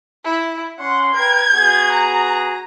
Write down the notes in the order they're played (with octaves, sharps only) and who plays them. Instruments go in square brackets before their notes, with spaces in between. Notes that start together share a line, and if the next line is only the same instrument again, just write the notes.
[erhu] E4
[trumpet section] C#4 C6 [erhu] F#5
[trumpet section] A#4 B4 G5 [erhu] G#6
[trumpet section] B3 F#4 G#4
[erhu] A#5